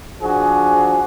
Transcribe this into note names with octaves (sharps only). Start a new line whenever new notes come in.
F3 D4 F#4 G#4